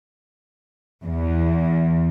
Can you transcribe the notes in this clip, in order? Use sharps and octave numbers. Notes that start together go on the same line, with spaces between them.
E2